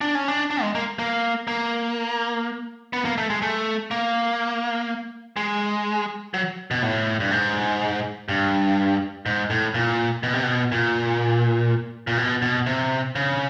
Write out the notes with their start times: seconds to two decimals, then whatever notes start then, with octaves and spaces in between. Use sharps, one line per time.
0.01 D4
0.15 C#4
0.28 D4
0.51 D4
0.62 G#3
0.75 A#3
0.99 A#3
1.47 A#3
2.93 B3
3.05 A#3
3.18 A3
3.30 G#3
3.42 A3
3.91 A#3
5.36 G#3
6.34 F#3
6.71 B2
6.82 A2
7.20 G2
7.31 G#2
8.28 G2
9.26 G#2
9.50 A2
9.74 A#2
10.23 B2
10.33 C3
10.43 B2
10.72 A#2
12.07 A#2
12.18 B2
12.42 B2
12.66 C3
13.15 C#3